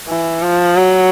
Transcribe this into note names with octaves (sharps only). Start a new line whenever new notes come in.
E3
F3
F#3